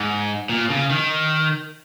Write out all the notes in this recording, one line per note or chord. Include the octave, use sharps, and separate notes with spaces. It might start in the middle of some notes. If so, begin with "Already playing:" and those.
Already playing: G#2
A#2
C#3
D#3